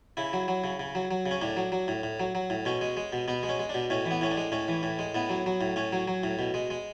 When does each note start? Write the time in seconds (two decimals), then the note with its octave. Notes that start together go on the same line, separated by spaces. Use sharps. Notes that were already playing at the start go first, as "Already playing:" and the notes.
0.17 C#3 E4
0.33 F#3
0.48 F#3
0.64 C#3
0.80 C#3
0.95 F#3
1.11 F#3
1.26 C#3
1.31 C#4
1.41 A2 D4
1.57 F#3
1.72 F#3
1.88 A2
2.03 A2
2.20 F#3
2.35 F#3
2.50 A2
2.65 B2 C#4
2.81 G#3
2.97 G#3
3.13 B2
3.28 B2 B3
3.43 G#3
3.49 C#4
3.59 G#3
3.69 D4
3.74 B2
3.90 A2 C#4
4.06 E3
4.11 B3
4.21 A2 C#4
4.31 D4
4.37 G#3
4.52 A2 C#4
4.68 E3
4.83 A2
4.99 G#3
5.15 A2 B3
5.30 F#3
5.46 F#3
5.61 A2
5.76 A2 C#4
5.93 F#3
6.08 F#3
6.23 A2
6.39 B2
6.54 G#3
6.70 G#3